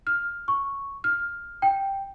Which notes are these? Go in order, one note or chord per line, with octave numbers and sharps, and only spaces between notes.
F6
C#6
F6
G5